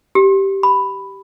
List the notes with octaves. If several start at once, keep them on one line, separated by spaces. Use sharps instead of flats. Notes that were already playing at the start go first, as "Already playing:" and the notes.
G4
B5